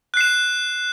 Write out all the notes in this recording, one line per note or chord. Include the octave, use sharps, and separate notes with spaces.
F#6 C7 E7